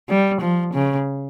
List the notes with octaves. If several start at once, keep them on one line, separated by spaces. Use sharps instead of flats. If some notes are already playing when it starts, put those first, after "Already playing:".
G3
F3
C#3